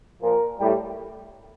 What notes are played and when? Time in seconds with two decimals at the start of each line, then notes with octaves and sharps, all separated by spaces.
0.22 A#2 F3 A#4
0.59 A2 G3